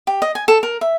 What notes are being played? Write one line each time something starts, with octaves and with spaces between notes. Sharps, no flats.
G4
D#5
G#5
A4
A#4
E5